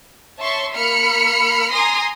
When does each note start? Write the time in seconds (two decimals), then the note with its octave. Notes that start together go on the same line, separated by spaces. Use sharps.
0.38 C#5 E5 A5 C6 C#6
0.74 A#3 B5 F6 C#7
1.71 G#5 A#5 C6 D#6 A#6 C7